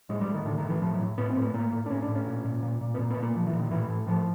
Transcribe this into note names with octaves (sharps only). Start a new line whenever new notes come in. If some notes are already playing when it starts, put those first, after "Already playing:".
A2 G#3
G3
A2
D#3
A2 D3
D#3
A2
E3
A2 F3
F#3
A2
A2 B3
C4
A2
B3
A2 A#3
A2
D4
A2 C#4
D4
A2
C#4
A#2
A#2
A#2
A#2
B3
A#2 A#3
B3
A#2
A#3
A#2 F3
E3
A#2
D#3
A2 E3
A2
A2 F3